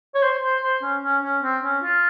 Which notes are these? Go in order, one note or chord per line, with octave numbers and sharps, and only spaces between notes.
C#5
C5
C5
C5
C#4
C#4
C#4
C4
C#4
F4